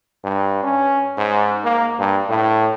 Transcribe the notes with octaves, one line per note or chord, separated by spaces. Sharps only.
G2
C#4
G#2
A#3
G2
A2